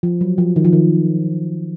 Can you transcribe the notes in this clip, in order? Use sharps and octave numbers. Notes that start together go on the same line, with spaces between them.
F3
F#3
F3
D#3
F3
D#3